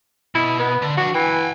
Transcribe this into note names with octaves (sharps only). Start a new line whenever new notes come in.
B2 E4
B3
D3
F3 D4 F#4
E3 G5 G#5